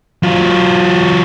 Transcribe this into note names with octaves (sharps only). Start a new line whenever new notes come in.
F#3 F4